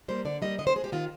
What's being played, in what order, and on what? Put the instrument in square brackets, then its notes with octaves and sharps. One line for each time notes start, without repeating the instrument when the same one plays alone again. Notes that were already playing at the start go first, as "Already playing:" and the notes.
[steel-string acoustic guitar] G3 A#3 C5
D3 D5
G3 A#3 D#5
D3 D#5
C5
G#3 G#4
G4
D#3 F4